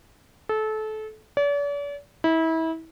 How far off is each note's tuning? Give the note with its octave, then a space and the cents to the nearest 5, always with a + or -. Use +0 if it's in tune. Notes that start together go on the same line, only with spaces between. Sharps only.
A4 -25
D5 -45
E4 -30